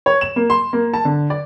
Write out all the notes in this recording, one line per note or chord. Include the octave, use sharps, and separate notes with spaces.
C#5
E7
A#3
C6
A#3
A5
D3
D5